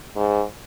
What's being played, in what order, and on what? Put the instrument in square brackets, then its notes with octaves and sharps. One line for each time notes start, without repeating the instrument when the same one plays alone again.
[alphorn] G#2